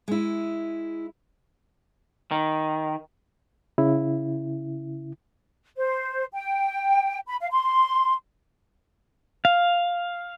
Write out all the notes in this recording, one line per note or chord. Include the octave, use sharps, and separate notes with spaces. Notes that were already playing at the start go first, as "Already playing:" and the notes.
G#3 E4
D#3
C#3 E4
C5
G5
B5
F5
C6
F5